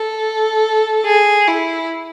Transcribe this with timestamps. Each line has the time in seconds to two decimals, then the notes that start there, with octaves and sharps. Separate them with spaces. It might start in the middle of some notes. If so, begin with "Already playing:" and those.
Already playing: A4
1.05 G#4
1.47 E4